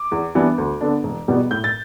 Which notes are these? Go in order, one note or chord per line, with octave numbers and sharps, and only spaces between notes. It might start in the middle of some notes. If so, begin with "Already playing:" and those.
Already playing: D6
E2
E3 G3 B3 D4
D2
D3 B3 D4
E1
E2 B2 G3 B3
A2 G6
A6